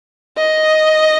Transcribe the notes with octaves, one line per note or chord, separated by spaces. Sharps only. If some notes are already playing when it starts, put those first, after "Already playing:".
D#5